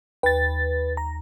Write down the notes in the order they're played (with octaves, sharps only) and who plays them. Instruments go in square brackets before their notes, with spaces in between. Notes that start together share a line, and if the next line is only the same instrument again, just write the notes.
[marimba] D#2 [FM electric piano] B4 A6
[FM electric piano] A#5